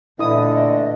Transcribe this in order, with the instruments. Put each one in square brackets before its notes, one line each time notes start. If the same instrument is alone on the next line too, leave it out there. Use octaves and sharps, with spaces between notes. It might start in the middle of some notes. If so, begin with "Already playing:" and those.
[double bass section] A#2 [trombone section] D3 E3 A3 [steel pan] E4 D#6 [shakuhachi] D#5